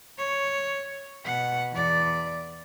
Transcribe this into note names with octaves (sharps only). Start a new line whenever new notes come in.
C#5
B2 F#5
E2 D5